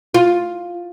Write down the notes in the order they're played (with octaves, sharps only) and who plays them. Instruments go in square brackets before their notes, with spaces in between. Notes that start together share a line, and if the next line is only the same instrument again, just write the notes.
[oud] F4